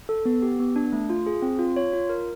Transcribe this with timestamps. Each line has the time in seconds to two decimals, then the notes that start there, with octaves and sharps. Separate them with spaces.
0.09 A4
0.25 B3
0.42 G4
0.60 B3
0.76 D4
0.92 A3
1.10 F4
1.27 G#4
1.42 C4
1.59 F4
1.76 C#5
1.93 F4
2.09 A#4